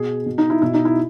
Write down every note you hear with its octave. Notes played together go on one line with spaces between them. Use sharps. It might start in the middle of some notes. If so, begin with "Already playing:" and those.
Already playing: B2 G#4
B2
D#4
E4
B2 E4
D#4
E4